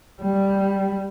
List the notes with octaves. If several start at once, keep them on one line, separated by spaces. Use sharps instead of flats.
G3